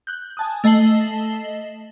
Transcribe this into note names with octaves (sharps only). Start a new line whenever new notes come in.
F#6 G6
G#5 A5 D#6
A3 D#5 A5 C7 F#7 G7